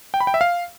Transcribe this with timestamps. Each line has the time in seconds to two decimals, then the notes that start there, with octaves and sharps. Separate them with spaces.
0.14 G5
0.20 B5
0.27 G5
0.34 E5
0.41 F5